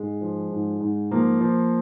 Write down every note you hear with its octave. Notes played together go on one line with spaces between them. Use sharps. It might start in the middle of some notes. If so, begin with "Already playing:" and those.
Already playing: G#2 G#3
F3
G#2
G#2
F3 A#3
F3